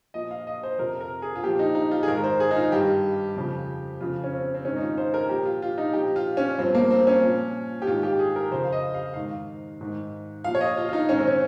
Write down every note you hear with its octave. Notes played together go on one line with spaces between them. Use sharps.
A#2 F3 D#5
F5
D#5
C5
F2 C3 F3 A#4
A#4
G#4
F4
A#2 F3 G4
D#4
D#4
F4
G#4
G#2 D#3 A#4
C5
G#4
D#4
F4
G2 D#3 G4
F2 C#3 F3
F2 C#3 F3 F4
C#4
C4
C4
G#2 D#3 C#4
D#4
F4
C5
A#4
A#2 F3 G4
F4
F4
D#4
A#2 F3 G4
F4
C#4
G2 F3 C4
A#3
C4
C#4
A#2 F3
G4
G#2 D#3 F4
G4
G#4
A#4
F2 C#3 F3 C5
F5
D#5
F5
G#2 D#3 F5
G#2 D#3
A#2 F3 F5
C#5
D#5
F4
F4
D#4
G#2 D#3 C#4
C4
C#4